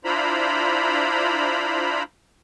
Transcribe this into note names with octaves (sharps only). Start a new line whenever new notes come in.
D4 E4 F4 C5 A#5 B5